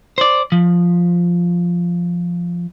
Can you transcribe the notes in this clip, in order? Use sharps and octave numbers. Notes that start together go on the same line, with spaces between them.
C5 D5
F3